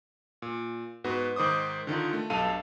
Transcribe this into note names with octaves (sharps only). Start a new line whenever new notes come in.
A#2
G#2 B3 F#4 B4
G#2 D#3 C5 D6 D#6
D3 D#3 D#4 F4
A3
B1 G2 A4 F5 A5 D#7